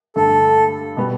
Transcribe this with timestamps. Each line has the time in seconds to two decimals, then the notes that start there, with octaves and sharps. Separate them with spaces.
0.16 G2 D3 A3 A4
0.97 B2 G3 B3